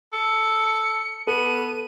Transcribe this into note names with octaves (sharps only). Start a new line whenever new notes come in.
A4 C#7
B3 A4 D#7